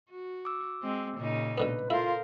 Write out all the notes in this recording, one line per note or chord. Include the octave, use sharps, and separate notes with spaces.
F#4
D6 E6
G#3 C4
A#2 C#3 D#4
B2 D3 B3 B4
E4 F4 A4 A#4 C5 F5